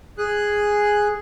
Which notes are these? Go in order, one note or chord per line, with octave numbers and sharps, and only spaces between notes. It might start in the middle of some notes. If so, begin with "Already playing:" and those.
G#4 F#6